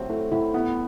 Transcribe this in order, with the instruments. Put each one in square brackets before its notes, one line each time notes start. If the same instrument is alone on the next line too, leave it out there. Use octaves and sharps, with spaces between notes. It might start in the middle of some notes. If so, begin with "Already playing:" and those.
Already playing: [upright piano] A2 F#3 C4
[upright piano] A3 [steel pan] E4
[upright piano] A2 [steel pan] E4
[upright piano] B3 [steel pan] E4